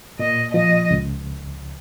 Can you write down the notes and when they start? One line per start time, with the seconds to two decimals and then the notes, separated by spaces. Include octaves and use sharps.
0.19 A#2 D#5
0.54 F3 D#5
0.91 C#2